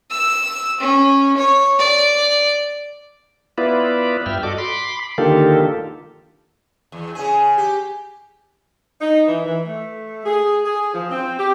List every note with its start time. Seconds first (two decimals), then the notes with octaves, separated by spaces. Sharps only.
0.11 E6
0.80 C#4
1.37 C#5
1.79 D5
3.58 B3 E4 F4 B4 D5
4.26 G2 E5 G5 F6
4.43 F#4 A4 D5 D#5 D6
4.58 B5 C6 D6
5.18 D3 D#3 A#3 F4 G4 A4
6.92 E2
7.15 C#3 G#4
7.58 G4
9.00 D#4
9.26 E3
9.45 E3
9.67 A3
10.25 G#4
10.65 G#4
10.93 F3
11.09 C4
11.38 G4